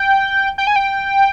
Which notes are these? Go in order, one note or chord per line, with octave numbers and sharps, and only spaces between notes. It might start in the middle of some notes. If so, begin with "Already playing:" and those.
Already playing: G5
G5
G#5
G5